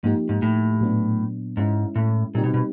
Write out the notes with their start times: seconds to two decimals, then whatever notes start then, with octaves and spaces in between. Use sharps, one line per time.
0.03 G#2 F3 A#3 D#4 G4
0.29 G#2
0.42 A2
0.81 A#2 F#3 B3 D4
1.57 G#2 G#3 C#4 E4
1.95 A2
2.34 A#2 G3 C4 D#4 G4
2.44 B2
2.54 B2